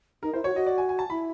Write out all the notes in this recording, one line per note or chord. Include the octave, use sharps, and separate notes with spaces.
D#4 A#4
E4 C5
F#4 C#5
F#4 D#5
D5
G#5
G#5
A5
E4 B5